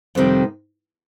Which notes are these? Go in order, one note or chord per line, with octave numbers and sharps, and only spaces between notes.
F2 C3 D#3 G3 C4